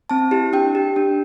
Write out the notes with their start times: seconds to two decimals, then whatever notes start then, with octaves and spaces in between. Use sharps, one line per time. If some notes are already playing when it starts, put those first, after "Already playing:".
0.10 C4 A5
0.31 E4 G4
0.53 D4 G5
0.75 G4
0.96 D4